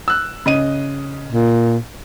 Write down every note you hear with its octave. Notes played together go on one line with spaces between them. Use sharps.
E6 F#6
C#3 D#5 D#7
A#2